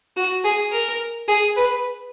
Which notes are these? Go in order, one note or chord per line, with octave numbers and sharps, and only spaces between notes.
F#4
G#4
A#4
G#4
B4